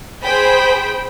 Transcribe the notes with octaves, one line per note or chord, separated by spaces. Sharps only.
G#4 C5 G5 B5